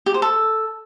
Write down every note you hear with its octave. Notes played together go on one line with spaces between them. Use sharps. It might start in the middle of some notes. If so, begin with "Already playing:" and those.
G4
C5
A4